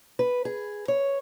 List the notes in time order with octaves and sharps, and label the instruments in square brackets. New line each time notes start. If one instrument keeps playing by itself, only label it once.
[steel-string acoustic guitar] B4
G#4
C#5